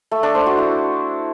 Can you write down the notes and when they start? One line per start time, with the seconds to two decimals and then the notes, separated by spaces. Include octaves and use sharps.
0.11 A3
0.23 D4
0.35 C5
0.46 F#4
0.58 E4